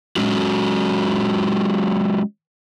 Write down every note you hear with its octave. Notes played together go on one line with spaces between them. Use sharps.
F#3 G#3 C#4 F#4